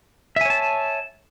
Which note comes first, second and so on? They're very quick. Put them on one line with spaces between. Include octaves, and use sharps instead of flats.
E5 G#5 C#5 A5